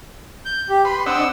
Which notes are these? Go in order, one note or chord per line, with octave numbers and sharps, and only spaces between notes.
G6
G4
B4 B5 C6
C4 D4 D#5 F#5 E6